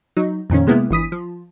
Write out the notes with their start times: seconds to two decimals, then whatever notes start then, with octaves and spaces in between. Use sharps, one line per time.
0.17 F#3 D#4
0.50 F2 A#2 D#3 C#4
0.67 C3 G#3 A#3 B3 E4
0.90 G1 E3 D#6 B6
1.12 F3